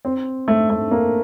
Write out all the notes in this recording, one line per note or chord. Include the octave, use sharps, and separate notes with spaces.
C4
A3
A3
A#3